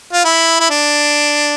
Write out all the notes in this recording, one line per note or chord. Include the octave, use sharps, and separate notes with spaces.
F4
E4
E4
D4